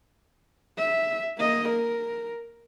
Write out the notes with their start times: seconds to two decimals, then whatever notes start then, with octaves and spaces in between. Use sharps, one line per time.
0.78 E5
1.38 A#3 D#5
1.69 A#4